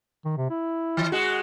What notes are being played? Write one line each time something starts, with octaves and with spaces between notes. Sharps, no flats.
D#3
C3
E4
E3
G#3 F#4